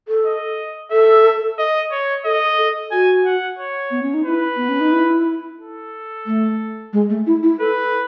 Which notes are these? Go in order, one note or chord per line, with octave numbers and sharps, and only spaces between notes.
A4
D#5
A4 E5
D#5
C#5
A4 D#5
A4
F#4 G#5
F#5
C#5
B3
C#4
D#4
E4 B4
B3
C#4
D#4
E4
A4
A3
G#3
A3
E4
E4
A4 B4